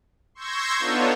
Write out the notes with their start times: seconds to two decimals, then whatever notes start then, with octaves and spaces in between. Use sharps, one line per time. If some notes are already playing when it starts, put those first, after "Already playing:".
0.35 C6 C#6 E6 G6 G#6 A#6
0.79 B3 D4 D#4 F4 A4 C#5